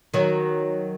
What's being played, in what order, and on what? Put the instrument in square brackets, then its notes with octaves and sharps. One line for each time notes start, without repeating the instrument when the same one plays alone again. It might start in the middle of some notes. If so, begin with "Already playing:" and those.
[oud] D#3 F#3